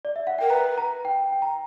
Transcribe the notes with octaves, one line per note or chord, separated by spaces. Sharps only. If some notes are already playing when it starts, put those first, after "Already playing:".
D5
E5
F#5
A#4 G5
B4 A#5
A#5
G5
G5
A#5